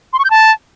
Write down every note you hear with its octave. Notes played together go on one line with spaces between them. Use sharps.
C6
C#6
G6
A5